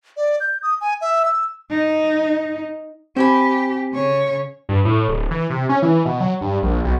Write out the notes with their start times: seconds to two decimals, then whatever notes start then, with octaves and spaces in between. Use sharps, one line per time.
0.17 D5
0.40 G6
0.63 D#6
0.81 G#5
1.01 E5
1.25 E6
1.71 D#4
3.16 C4 G4 C5 G#5 B5
3.94 C#3 C#5
4.69 G2
4.85 A2
5.09 D1
5.31 E3
5.50 C3
5.69 C#4
5.82 E3
6.06 B2
6.20 F#3
6.41 G2
6.63 A#1
6.85 B1